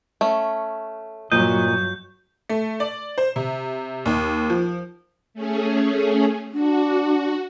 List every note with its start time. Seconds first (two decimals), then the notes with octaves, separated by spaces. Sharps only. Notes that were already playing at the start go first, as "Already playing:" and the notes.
0.21 A3 C#4
1.32 G2 A#2 F#3 D#5 G6
2.49 A3
2.80 D5
3.18 C5
3.36 C3
4.06 D#2
4.50 F3
5.34 A3 C#4 G#4
6.53 D4 F#4